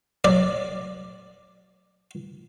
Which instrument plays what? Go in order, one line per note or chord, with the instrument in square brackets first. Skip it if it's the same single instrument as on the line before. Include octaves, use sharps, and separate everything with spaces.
[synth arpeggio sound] F#3 [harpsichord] D5